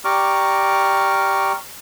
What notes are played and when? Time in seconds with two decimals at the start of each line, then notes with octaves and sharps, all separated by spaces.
0.05 G4 D5 A#5 C#6 D6 F6